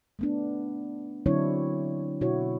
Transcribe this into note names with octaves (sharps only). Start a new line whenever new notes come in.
A3 B3 D4
D3 F#3 C4 D4 E4 C#5
B2 E4 F#4 C#5